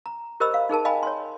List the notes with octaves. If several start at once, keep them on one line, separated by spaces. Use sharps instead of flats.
A#5
G4 A#4 C5 D#5 B5 E6
F5
D#4 G#4 A#4 A5
D#5 F5 G5 G#5 B5
C#5 C6